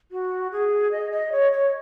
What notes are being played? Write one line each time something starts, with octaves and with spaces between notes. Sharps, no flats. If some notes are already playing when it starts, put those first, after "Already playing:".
F#4
G#4
D#5
D#5
C#5
C#5